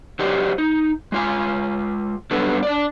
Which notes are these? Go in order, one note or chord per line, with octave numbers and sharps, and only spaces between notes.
F#3 G4 C5 D5 D#5
D#4
G#3 F4 G#5
F#3 G3 B3 D4 A4 B4
D4 D5